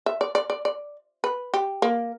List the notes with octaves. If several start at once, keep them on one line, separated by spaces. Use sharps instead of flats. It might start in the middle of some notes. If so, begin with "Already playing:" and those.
E5
D5
D5
D5
D5
B4
G4
A#3